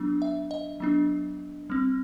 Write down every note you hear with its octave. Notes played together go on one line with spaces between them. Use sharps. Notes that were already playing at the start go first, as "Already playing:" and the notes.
Already playing: F#3 B3 D4
E5
D#5
F#3 B3 D4
G3 C4